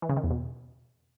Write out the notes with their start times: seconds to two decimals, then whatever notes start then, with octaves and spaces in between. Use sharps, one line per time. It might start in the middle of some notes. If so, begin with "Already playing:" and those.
0.02 E3
0.09 C#3
0.16 D#3
0.24 E2
0.31 B2